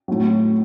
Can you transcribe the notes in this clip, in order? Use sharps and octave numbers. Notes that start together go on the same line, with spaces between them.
A2 F#3